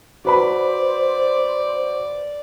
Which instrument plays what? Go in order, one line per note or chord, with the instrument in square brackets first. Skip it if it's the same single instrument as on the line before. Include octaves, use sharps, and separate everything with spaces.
[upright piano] F#4 B4 B5 [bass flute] C5 [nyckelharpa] D5